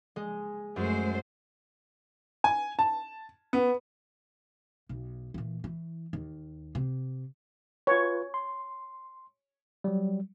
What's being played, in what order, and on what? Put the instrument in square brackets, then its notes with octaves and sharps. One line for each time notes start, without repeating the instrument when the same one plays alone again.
[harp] G#3
[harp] F#2 [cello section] G#3 A3 C5
[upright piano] G#5
A5
B3
[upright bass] B1
A#2 E3
E3
D#2
C3
[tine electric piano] F4 B4 [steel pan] C#5
[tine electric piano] C6
F#3 G3